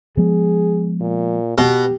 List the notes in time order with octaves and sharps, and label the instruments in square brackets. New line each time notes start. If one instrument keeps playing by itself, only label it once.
[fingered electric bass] F3 G#3 B3 [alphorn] G#4
[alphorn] A#2
[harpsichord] B2 [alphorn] G4